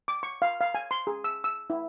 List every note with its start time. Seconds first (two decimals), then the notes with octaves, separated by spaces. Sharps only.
0.08 D6
0.23 C#6
0.42 F5
0.61 F5
0.75 G#5
0.91 C6
1.07 G#4
1.24 E6
1.44 E6
1.70 E4